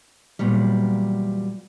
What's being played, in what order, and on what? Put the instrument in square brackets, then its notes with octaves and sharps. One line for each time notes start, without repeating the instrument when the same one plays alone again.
[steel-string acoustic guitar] E2 A#2 F#3 G3